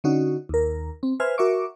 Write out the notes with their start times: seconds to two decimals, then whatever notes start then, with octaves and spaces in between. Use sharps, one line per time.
0.04 D3 C#4 D#4 F#4
0.49 D#2 A#4
1.03 C4
1.20 B4 C5 E5 G#5 F6
1.38 F#4 A#4 E5 C#6 D6